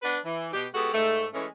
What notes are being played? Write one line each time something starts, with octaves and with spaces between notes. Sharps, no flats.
B3 D4 B4
E3
B2 G4
G#3 B3 F#4 G4 A4
G#2 A3
E3 G#3 A3 C#4